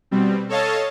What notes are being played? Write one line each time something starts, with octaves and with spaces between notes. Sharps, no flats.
B2 G3 C4
A4 C#5 D#5 F5 A5